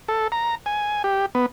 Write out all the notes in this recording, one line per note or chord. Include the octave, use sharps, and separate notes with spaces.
A4
A#5
G#5
G4
B3